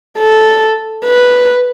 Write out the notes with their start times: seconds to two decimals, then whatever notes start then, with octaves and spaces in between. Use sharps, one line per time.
0.18 A4
1.05 B4